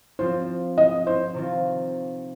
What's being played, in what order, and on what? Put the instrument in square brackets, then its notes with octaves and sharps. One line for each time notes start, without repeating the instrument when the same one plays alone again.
[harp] F3 C4 F4 [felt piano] C5
[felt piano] D#5
C5
[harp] C3 D#3 C4 F4